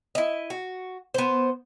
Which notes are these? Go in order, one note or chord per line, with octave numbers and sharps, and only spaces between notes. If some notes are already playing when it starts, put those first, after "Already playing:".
E4 D#5
F#4
B3 C5